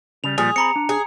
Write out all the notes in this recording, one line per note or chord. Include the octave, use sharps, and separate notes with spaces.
C#3 G3 F7
A#2 F3 G3 G#4
C4 A#5 B5 C#7
D4
G#4